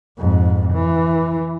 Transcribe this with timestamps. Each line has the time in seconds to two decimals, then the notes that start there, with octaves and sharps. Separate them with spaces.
0.18 F2 G#2
0.73 E3